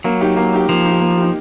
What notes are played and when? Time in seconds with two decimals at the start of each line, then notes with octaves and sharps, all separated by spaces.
0.04 F#3 A#3
0.21 D#4 G4
0.37 A#3
0.53 D#4 G4
0.69 F3 A#3
0.85 D#4 G4
1.01 A#3
1.18 D#4 G4